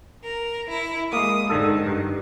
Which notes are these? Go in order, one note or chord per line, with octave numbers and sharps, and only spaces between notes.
A#4
E4
G#3 A#3 D#6
G#2 D3 D#3 A4
G2